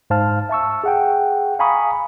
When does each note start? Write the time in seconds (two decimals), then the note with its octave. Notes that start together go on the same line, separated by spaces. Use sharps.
0.10 G#2 C5 F5 A5 F6
0.49 E5 A5 C#6 E6
0.84 G#4 F#5 G5
1.59 F5 G#5 A#5 B5 C#6 D#6